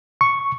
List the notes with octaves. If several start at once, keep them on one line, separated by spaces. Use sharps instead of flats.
C#6